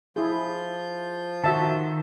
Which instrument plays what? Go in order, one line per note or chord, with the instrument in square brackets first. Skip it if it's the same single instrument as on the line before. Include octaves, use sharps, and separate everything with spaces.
[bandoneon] F3 F4 G6 [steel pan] E4 G#4
[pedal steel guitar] D#3 [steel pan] F#4 E5 A5